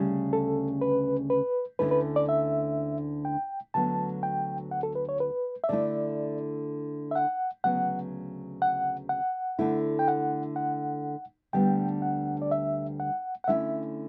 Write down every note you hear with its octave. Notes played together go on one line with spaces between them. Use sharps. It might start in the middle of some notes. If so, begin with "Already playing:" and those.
Already playing: D2 C#3 G3 C#4
A4
B4
B4
D2 D3 A3 C#4 E4 B4
B4
D5
E5
G5
D2 D3 F#3 B3 A5
G5
F#5
A4
B4
C#5
B4
E5
D3 A3 E4 D5
E5
F#5
D2 C#3 F#3 B3 F#5
F#5
F#5
D3 A3 E4
G5
F#5
F#5
D2 D3 G3 B3 D4 G5
F#5
D5
E5
F#5
F#5
D3 A3 C#4 E4 E5